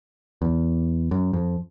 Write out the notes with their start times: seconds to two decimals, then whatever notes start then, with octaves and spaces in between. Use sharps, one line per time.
0.42 E2
1.11 F#2
1.33 F2